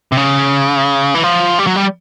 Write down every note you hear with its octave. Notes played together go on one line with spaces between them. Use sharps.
C3
C#3
E3
F3
G3
F#3
G3